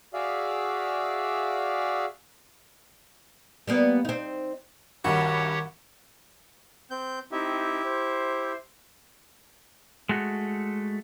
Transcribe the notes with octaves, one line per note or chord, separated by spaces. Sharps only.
F#4 G#4 D5 E5 F5
G3 A#3 B3
C4 D#4
C2 G2 D#3 F#4 G4 C#5 F#5 C#6
C4 G6
C4 D#4 E4 G4 E5
C5
G#3 A3 F#4